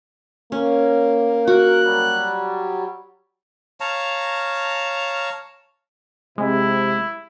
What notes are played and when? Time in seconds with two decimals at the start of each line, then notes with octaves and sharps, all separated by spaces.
0.52 A#3 C#4
1.47 F#4 A#4 F#6
1.82 F#3 G3
3.80 C#5 F5 A5 A#5
6.38 C3 G#3 E4